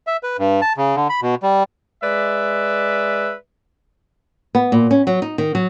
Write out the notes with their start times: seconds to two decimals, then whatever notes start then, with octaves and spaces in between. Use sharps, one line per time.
0.07 E5
0.23 B4
0.38 G2
0.62 A5
0.77 C#3
0.96 D3
1.09 B5
1.22 B2
1.43 G3
2.04 G#3 B4 D5 E5
4.55 B3
4.72 A#2
4.91 C#4
5.07 F#3
5.22 D#4
5.38 D#3
5.55 F#3